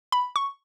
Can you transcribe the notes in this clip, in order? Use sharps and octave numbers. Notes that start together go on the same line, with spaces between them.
B5
C#6